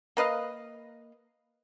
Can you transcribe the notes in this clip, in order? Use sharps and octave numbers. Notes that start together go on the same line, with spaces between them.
A#3 B4 D#5 F5